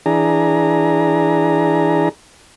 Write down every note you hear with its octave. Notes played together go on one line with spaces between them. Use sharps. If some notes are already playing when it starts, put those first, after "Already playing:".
E3 D4 G#4 A#5